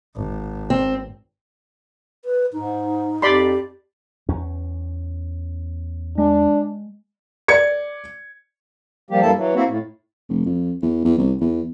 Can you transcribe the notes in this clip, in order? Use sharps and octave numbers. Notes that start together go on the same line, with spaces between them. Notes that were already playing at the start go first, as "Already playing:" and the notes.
G#1
C4
B4
G#2 D#4
F2 G4 D5 B5 C6
E2 C#4
G#3 D4
D5 G#6 C#7
F3 G3 A#3 G4
G2 G3 A#3 E4 A4 A5
E3 F#3
A#3 C4 E4 F#4
A2
F1
F2
E2
E2
C2
E2